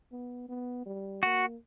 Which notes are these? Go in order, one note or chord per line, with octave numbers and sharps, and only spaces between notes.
B3
B3
G3
A#3 F#4